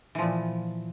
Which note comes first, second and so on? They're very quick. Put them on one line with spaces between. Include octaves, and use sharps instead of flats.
E3 F3 A#2